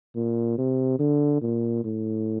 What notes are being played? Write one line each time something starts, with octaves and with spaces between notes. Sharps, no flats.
A#2
C3
D3
A#2
A2